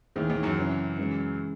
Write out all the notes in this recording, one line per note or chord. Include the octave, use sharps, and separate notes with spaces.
D#2 D#3 E3 C4 E4 G#4
D#2 D#3
F#2 F#3
C#3 E3 C4 E4
C#3 E3 G#3